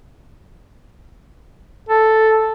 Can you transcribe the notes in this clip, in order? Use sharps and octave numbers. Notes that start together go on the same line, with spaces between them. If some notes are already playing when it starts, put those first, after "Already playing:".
A4